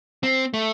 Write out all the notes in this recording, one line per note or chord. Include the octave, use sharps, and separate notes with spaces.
C4
A3